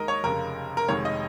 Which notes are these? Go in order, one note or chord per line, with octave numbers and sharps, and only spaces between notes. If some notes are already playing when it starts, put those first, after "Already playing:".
Already playing: D#2 D#3 G#3 A#4 D#5
C#5
F1 F2 C#3 A#4
A#4
F1 F2 D#3 G#3 C#5
D#5